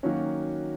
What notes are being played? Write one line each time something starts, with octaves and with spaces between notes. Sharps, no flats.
D#3 F#3 A#3 C#4 F#4